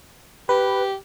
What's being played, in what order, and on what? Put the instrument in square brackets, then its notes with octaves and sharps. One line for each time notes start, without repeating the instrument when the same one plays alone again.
[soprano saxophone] G4 [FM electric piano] B4